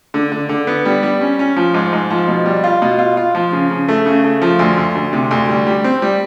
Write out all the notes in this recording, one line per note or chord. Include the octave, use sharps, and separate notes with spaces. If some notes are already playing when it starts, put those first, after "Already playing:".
D3
D3
D3
B3
G3
G3
C#4
C#4
F3
G#2
G#2
F3
B2
G3
F4
B2
F4
F4
F3
C#3
C#3
A3
C#3
A3
F3
D2
D2
D2
C3
D2
G3
G3
C4
G3